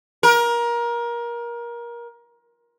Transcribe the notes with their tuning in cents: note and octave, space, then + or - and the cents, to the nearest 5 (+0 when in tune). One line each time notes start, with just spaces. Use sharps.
A#4 +25